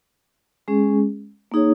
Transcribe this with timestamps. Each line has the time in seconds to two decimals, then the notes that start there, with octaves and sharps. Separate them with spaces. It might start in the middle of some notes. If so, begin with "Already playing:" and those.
0.68 G#3 C#4 G#4
1.52 A#3 D#4 G#4 C#5